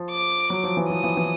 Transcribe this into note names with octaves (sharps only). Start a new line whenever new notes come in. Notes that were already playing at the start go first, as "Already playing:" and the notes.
Already playing: F3
D6
F#3
F3
E3
F3 D#6
E3
E3